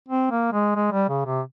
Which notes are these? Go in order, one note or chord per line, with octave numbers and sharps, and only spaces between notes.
C4
A#3
G#3
G#3
G3
C#3
C3